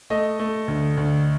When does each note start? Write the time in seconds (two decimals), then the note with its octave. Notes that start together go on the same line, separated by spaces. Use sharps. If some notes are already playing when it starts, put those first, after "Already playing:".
0.10 A3 D#5
0.39 A3
0.68 D2
0.97 D2